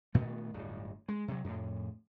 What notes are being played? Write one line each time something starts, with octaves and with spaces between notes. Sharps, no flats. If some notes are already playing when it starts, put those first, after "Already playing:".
A#2 D#3 A3 B3
D1 G1
G#3
C3 F#3
F2 A2